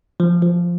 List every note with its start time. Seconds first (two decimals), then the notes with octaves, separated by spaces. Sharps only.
0.20 F3
0.42 F3